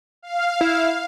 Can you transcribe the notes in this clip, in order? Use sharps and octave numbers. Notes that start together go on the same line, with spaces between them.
F5
E4